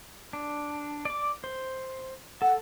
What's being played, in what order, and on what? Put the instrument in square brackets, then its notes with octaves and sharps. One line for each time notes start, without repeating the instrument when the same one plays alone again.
[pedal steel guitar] D4
D5 D6
C5
[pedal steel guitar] A4 [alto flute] F#5